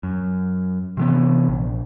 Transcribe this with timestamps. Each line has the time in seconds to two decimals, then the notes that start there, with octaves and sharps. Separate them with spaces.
0.03 F#2
0.97 C3 E3 B3
1.49 A#1